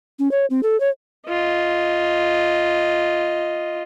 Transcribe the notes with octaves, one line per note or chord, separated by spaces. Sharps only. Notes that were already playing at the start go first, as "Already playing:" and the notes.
C#4
C#5
C4
A4
C#5
F4 D#5